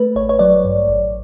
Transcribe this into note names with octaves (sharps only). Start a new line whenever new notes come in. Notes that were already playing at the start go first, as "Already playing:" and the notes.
Already playing: A3 B4
A1 C#5
C#5
F#3 D5
G2
A1